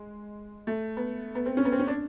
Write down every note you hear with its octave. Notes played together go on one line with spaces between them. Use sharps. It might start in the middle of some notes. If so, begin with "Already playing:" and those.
Already playing: G#3
A3
B3
B3
C4
C#4
B3
C4
C#4
D4